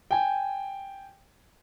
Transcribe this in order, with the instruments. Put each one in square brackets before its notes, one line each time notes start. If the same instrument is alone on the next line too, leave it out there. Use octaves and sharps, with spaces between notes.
[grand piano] G5 G#5